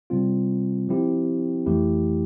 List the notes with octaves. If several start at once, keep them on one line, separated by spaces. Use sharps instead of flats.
C3 G3 C4 F4
F3 C4 E4 G4
F2 E3 A3 E4 G4